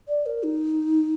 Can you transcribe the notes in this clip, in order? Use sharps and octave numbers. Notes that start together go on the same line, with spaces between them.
D5
A#4
D#4